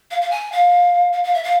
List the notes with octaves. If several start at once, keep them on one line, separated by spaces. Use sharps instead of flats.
F5
F5
G#5
F5
F5
F5
E5
F5